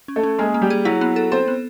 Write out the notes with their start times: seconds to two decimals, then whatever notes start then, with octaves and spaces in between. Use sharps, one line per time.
0.08 C#4
0.16 A3 A4
0.23 C#4
0.38 G#3 A#3 G#4
0.54 A#3
0.62 G3 G4
0.70 G#4
0.85 F#3 E4 F#4
1.01 B3
1.16 A4
1.32 C4 A4 C5
1.48 B3